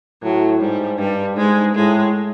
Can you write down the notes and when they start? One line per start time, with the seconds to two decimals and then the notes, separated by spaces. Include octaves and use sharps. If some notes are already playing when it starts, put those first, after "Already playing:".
0.22 A2 F#3
0.60 G#2 G3
0.98 G2 G3
1.36 G#2 G#3
1.75 A2 G#3